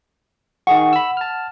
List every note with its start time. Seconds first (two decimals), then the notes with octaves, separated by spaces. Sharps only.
0.67 D#3 G#4 F#5 C#6
0.93 B5 E6
1.17 A5 F6